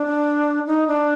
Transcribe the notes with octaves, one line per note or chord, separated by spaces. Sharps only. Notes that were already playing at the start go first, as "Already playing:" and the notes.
Already playing: D4
D#4
D4